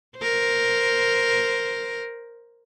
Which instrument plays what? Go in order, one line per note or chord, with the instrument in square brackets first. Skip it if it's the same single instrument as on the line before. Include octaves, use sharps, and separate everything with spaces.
[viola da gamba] A#4 C5